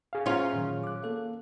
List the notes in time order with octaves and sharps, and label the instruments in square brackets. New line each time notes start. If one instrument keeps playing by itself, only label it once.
[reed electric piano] G#4 F5
[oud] C#4 F4 [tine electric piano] C5 A#5
[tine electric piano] A#2 D#3 F#3
D6 F#6
A#3 A4 F5